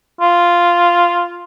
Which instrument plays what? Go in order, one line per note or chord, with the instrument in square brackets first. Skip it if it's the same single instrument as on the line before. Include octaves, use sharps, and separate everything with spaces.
[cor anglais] F4